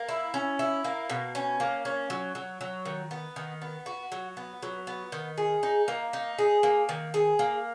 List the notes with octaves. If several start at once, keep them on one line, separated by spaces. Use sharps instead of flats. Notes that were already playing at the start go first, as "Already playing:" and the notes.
Already playing: A#3
E4
C#4
E4
A#3
B2
C#4
A#3
C#4
F#3
F#3
F#3
D#3
B3
D#3
B3
F#4
F#3
B3
F#3
B3
D#3
G#4
D#4
A#3
D#4
G#4
A#3
D#3
G#4
A#3